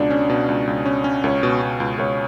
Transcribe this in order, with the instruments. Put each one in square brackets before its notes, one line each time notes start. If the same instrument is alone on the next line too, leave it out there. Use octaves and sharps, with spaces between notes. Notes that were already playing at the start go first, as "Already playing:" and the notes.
Already playing: [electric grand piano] C#2 B2 [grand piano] D4
[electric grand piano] C#4
B2
C#2
C#2
C#4
C#4
[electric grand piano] C#2 [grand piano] C#5
[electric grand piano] B2
B2
C#2
[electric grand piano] C#2 [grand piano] C#5